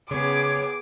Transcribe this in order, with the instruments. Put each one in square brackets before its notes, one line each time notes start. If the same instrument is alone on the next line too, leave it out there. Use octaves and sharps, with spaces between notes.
[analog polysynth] C#3 [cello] B3 G#4 [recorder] C#5 [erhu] D6